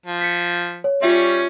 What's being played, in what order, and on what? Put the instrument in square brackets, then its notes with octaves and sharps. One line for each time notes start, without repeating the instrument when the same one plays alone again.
[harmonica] F3
[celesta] B6 C#7
C#5
[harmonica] G3 C#4 C#5 [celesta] F4 E5